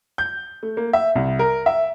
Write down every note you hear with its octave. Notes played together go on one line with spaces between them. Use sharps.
G6
A3
A#3
E5
C2
A#4
E5